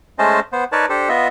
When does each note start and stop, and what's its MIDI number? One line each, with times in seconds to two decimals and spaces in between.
0.19 0.40 56
0.19 0.40 57
0.19 0.40 61
0.19 0.40 72
0.19 0.40 75
0.19 0.40 81
0.53 0.64 59
0.53 0.64 72
0.72 0.86 63
0.72 0.86 70
0.72 0.86 71
0.72 0.86 73
0.72 0.86 74
0.72 0.86 81
0.89 1.09 62
0.89 1.09 67
0.89 1.09 69
0.89 1.09 72
1.09 1.28 59
1.09 1.28 65
1.09 1.28 75
1.09 1.28 76